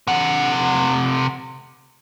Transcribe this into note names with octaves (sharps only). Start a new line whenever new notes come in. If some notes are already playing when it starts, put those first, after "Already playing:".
C3 F#5